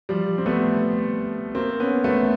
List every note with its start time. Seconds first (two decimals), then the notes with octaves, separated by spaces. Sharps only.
0.09 F3 G3
0.38 C4
0.46 A3 B3
1.55 A#3 C4
1.80 B3 C#4
2.04 A3 B3